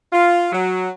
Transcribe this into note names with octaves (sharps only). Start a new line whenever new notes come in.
F4
F#3